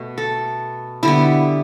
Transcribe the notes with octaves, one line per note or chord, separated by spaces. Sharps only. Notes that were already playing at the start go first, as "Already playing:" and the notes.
Already playing: B2 A3
A4
D3 G3 B3 E4